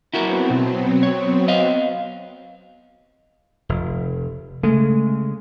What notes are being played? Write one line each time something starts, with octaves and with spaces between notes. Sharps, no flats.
F#3 B3 C4 E4 F#4 A#4
B2
C#5
D#5 F5
F1
C#3 G#3 A3